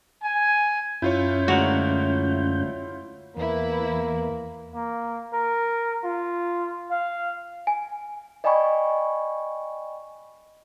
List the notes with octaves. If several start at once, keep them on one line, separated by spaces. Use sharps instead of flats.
G#5
F#2 C#4 E4 F4 C#5 G6
D2 G#3 F#4 A#4
E2 A#3 E4 B4
A#3
A#4
F4
F5
G#5
D5 D#5 G5 G#5 B5 C#6